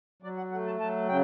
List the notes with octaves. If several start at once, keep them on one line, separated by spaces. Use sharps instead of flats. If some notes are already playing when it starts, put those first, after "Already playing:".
F#3 D5
F#5
A3 F#5
A5
F#3 A5
C#3 G5